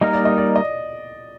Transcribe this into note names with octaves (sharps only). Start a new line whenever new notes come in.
G3 A#3 D#4 A#4 D#5
D5
D#5
D5
D#5